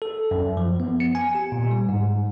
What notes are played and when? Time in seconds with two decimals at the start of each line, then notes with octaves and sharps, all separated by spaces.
0.02 A4
0.31 F#2
0.57 F3
0.80 B3
1.00 C#7
1.15 G#5
1.35 G4
1.52 A#2
1.71 G3
1.89 G#2